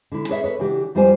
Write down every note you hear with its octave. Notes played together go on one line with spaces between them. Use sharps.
D3 E4
G#4 B4 C#5 D5 E5
A4 B4 C#5
C#3 E3 D4 F#4 G4
F2 G3 E4 F4 C5 G#5